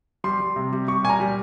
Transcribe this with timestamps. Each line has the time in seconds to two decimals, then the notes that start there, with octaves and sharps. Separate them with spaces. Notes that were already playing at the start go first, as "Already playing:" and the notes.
0.24 G3 C6
0.40 G3
0.56 C3
0.72 G3
0.88 G3 C#6
1.04 A#2 G#5
1.09 A#5
1.20 G3